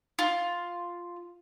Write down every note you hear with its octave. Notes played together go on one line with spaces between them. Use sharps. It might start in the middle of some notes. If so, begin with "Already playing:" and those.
F4